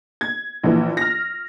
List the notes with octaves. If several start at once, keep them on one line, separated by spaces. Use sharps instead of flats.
G#6
A#1 E3
F6 A#6